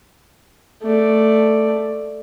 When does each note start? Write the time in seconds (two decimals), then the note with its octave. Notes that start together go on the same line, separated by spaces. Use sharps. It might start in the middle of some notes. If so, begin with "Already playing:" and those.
0.82 A3 D5